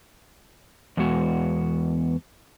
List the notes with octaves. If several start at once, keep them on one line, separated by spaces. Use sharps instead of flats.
E2 G#3 B3 F#4